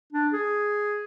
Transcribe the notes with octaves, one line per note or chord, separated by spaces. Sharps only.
D4
G#4